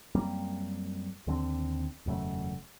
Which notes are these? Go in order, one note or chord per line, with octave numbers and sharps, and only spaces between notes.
F#2 G3 A#3 C4
D#2 D3 A3 C4
E1 F#2 C#3 A3